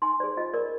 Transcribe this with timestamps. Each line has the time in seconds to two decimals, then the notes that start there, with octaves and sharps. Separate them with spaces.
0.02 D#4 G#5 C6
0.20 G#4 C5 D5
0.37 F4 D#5
0.53 A#4 D5